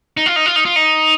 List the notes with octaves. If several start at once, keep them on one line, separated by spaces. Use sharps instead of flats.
D#4
F4
D#4
F4
D#4
F4
D#4